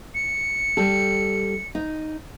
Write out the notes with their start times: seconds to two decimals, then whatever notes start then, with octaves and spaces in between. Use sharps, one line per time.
0.14 C#7
0.77 G3 A4
1.75 D#4